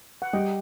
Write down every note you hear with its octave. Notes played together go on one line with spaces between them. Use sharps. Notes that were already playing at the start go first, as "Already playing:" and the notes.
F#5
G3 D#5 G5